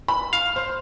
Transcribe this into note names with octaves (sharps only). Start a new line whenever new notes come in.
B5
F5 F6
C5